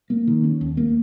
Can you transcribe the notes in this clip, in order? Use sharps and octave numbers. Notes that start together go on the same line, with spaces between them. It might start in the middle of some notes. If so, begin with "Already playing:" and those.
A#3
D#3
C#4
D#2
A#3